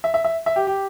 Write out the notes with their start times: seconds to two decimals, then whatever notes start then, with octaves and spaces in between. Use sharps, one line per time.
0.04 E5
0.14 E5
0.24 E5
0.46 E5
0.56 G4
0.67 G4